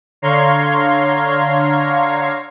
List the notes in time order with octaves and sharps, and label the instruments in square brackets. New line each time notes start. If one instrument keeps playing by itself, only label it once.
[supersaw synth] D3 C#5 F5 A#5 C6 G#6